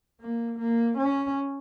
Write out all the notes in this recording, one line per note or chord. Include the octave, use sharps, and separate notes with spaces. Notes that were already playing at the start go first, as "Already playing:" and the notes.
A#3
A#3
C#4